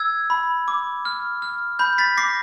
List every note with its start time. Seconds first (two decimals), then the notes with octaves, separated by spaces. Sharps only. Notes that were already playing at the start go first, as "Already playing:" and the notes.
Already playing: E6 G#6
0.30 B5
0.68 D6
1.05 F6
1.42 F6
1.79 B5 G6
1.98 A6 B6
2.17 D6 A#6 C7